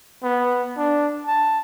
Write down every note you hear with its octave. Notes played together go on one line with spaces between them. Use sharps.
B3
D4
A5